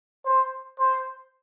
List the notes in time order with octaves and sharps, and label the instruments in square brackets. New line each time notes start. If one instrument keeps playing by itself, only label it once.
[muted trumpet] C5
C5